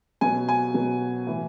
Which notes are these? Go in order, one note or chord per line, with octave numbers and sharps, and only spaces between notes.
B2 F#3 G#5
G#5
B2 F#3
A2 E3